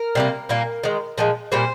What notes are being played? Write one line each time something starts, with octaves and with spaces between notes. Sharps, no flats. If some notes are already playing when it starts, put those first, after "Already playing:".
Already playing: A#4
C3 G3 A#3
A#2 G3 A#3
D#3 G#3
A#2 F3 G#3
A#2 G3 A#3 C5